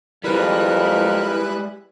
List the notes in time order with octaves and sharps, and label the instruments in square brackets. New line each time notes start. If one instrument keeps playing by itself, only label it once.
[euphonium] F2 [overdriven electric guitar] G3 G#3 [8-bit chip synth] E4 B4 F#6 [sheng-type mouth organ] A#4